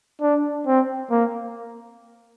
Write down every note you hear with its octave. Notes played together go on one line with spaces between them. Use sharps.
D4
C4
A#3